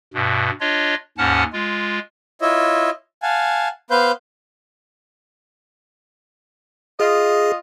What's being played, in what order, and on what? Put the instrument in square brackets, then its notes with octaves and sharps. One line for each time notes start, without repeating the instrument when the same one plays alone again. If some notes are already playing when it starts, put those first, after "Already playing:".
[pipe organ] G2 B2
D4 F4 C#5 D#5
D#2 G#2 C#4 F#5 A5 F6
G#3 F4
[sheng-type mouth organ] E4 F4 C#5 D#5 E5
F5 F#5 G#5 A5
B3 B4 C5 F5 G6
[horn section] F4 D#5 [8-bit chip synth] G#4